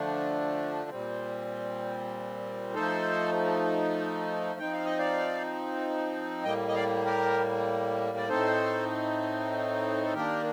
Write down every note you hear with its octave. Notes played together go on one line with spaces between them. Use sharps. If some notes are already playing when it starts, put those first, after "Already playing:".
Already playing: D3 F3 A3 D4
A#2 G3 C4
F3 A3 D#4 A4 C5
F3 C4 D#4 G5
F5
D#5
D5 F5
A2 G3 A#3 D#5 G5
D#5
D5 F5
G4 A#4
D5
A2 A3 C4 D#4 A4 C5
A4
D#3 A#3 D4 G4 A#4